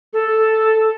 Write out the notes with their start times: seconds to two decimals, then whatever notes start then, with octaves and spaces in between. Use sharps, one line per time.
0.13 A4